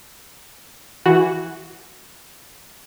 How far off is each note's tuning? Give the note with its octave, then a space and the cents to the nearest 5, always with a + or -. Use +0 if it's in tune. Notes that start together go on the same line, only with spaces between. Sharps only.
E3 -5 F#4 +0